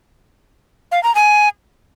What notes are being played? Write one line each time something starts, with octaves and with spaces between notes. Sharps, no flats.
F5
A#5
G#5